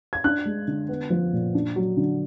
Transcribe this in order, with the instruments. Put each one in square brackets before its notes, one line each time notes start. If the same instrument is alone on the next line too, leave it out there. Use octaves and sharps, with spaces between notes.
[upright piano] G#6
D4 F#6
G#3
D3
B3
F3
A#2
D4
F#3
D3